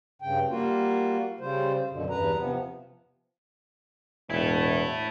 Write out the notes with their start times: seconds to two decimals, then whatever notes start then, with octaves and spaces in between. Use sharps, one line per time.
0.22 G2 C#3 G5
0.49 G3 A#3 F4 F#4
1.40 C#3 G3 C5
1.90 F#2 B2 D3
2.10 E2 G2 B4 A#5
2.37 C3 F3 B3
4.30 E1 E4 A4